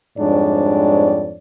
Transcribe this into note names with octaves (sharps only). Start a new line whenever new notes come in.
F2 G#2 G3 D4 C#5 D5